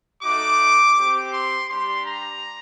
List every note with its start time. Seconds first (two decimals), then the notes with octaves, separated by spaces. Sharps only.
0.23 A3 D#4 F#4 D6
0.97 C4 G4
1.33 C6
1.69 G3 D4 G4 C6
2.06 A#5